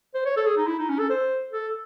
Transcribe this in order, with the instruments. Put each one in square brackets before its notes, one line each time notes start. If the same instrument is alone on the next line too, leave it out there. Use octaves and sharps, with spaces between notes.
[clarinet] C5
C#5
A4
G#4
D#4
E4
D#4
C#4
A4
C5
A4